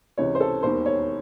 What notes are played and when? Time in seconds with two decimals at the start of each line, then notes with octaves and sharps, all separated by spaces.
0.18 C#2 C3 E3 C#5
0.35 C5
0.40 A4
0.63 E1 D#2 D#3 C5
0.86 C#5